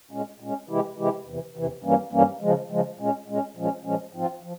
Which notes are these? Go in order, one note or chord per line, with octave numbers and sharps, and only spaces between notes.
A#2 G#3 C#4
A#2 G#3 C#4
C3 E3 G#3 E4 G4
C3 E3 G#3 E4 G4
E2 C3 E3
E2 C3 E3
G2 E3 G3 A#3 C#4
G2 E3 G3 A#3 C#4
C#3 F3 G#3
C#3 F3 G#3
A#2 G#3 C#4
A#2 G#3 C#4
A#2 F3 G#3 C#4
A#2 F3 G#3 C#4
G#2 F3 C4 F4
F3